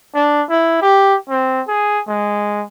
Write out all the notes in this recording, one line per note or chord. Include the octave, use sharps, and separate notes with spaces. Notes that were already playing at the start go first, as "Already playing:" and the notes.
D4
E4
G4
C4
G#4
G#3